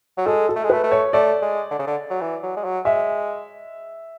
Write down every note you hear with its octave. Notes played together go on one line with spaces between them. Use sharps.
F#3
G#3 A4
A4
A3
G#3
A3 B4
A3
C#5
A3 D5
G#3
D3
C#3
D3
F#3
E3
F#3
G#3
F#3
G#3 E5